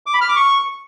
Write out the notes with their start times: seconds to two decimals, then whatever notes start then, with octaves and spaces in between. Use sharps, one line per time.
0.06 D6
0.14 B5
0.21 F6
0.29 D6
0.36 C#6